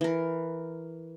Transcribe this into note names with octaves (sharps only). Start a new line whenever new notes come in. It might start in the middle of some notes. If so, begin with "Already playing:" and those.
E3 A#4